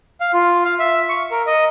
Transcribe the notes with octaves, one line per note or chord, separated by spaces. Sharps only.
F5
F4
F5
E5
C#6
A#4
D#5